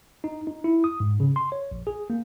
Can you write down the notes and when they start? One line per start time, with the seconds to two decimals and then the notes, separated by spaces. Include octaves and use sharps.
0.24 D#4
0.47 D#4
0.64 E4
0.84 D#6
1.00 G#2
1.20 C#3
1.36 C6
1.52 C#5
1.71 A#1
1.87 G#4
2.10 A#3